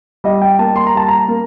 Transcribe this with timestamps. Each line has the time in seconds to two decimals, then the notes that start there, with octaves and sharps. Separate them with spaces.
0.24 G3 D#5
0.42 G5
0.59 A#3 A5
0.76 C6
0.87 A#5
0.94 G3 A5
1.08 A#5
1.28 A#3